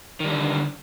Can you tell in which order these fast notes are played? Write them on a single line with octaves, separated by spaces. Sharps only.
D#3 G3 D3